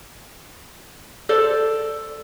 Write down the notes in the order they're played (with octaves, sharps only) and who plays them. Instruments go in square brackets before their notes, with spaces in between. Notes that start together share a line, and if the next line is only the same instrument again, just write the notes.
[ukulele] A4 C5 D5